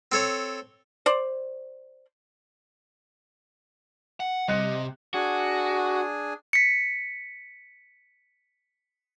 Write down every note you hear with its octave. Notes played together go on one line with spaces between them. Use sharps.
C4 A4 C#5
C5 D5
F#5
C3 G3 D#5 F#6 C#7
D4 F#4 G#4 G#5
B6 C#7